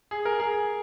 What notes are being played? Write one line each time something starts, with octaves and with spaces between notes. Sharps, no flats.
G#4
A#4
G#4